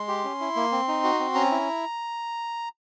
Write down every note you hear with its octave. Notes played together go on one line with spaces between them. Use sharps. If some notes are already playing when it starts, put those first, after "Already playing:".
Already playing: G#3 C6
G4
C#4
E4
A#3
C4
D#4
F#4
C4
C#4 A#5
E4